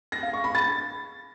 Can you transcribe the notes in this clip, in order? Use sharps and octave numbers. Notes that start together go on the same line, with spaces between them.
A#6
F5
C#6
B5
A6